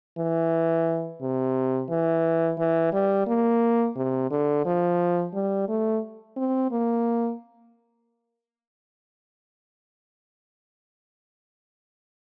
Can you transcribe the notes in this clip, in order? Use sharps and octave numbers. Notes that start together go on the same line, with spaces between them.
E3
C3
E3
E3
G3
A#3
C3
D3
F3
G3
A3
C4
A#3